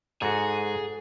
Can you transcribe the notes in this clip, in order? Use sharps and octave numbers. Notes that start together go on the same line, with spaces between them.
G#2 F#4 G#4 A4